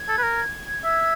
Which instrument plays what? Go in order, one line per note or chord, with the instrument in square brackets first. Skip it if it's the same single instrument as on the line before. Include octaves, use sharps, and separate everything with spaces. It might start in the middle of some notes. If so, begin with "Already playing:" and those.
Already playing: [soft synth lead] G#6
[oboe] A4
B4
A#4
E5